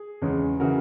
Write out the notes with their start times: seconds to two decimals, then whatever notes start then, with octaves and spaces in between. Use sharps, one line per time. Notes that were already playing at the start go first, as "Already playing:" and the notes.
Already playing: G#4
0.22 E2 C#3 G#3 C#4
0.60 C#3 E3 F#4 A#4